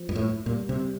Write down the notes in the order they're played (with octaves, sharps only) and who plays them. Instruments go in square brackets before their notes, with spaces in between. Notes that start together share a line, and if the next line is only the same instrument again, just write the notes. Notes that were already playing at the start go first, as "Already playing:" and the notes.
Already playing: [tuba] F3
[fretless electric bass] G2
A2
[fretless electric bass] A#2 [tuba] G3
[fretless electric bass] C3